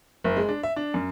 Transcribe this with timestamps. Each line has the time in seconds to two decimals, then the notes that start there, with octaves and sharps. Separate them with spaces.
0.24 F#1
0.37 G#3
0.49 D4
0.63 E5
0.76 D4
0.94 F#2